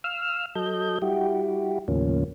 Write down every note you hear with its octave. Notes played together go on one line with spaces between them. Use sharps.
F5 E6 F6
F#3 A4 D#5 G6
G3 E4 F#4 G4
D#2 A2 C#3 F3 A#3 C#4